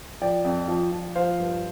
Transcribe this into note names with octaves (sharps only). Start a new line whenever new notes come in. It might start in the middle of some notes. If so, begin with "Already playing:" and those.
F3 D5 G5
F2
F3
F3
F3 C5 F5
G2